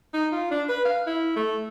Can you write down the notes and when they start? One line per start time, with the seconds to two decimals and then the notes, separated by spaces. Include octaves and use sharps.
0.14 D#4
0.32 F4
0.51 D4
0.69 B4
0.85 F5
1.07 E4
1.36 A3